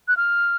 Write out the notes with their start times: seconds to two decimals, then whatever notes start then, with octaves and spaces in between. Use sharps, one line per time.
0.08 F#6
0.17 F6